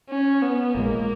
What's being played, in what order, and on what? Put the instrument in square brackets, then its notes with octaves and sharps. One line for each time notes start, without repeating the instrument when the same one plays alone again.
[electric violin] C#4
B3
[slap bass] A#1 A#2 G#3 [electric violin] A#3